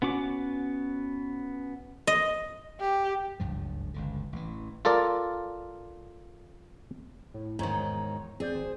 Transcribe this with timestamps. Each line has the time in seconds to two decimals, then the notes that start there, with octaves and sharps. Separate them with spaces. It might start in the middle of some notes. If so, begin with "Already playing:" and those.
0.02 B3 C#4 F#4 D6
2.07 D#5
2.80 G4
3.40 F#1 C#2 G2 F3
3.94 G1 C#2 D3
4.33 A1 E3
4.85 F4 A4 A#4 D5
7.34 A2
7.59 E2 G#2 D#3 C#5
8.40 C4 G#4 D5 G6
8.55 G#1 C5